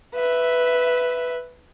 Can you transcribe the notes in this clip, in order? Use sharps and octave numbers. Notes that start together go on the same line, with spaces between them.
B4 E5